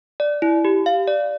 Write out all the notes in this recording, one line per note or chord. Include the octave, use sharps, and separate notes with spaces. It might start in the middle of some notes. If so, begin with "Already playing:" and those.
D5
E4
G4
F5
D5